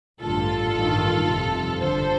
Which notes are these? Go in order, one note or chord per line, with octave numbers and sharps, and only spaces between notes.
A1 G2 D3 F4 A4
A1 G2 D#3
G1 F2 C3
G1 G2 D3 A4 C5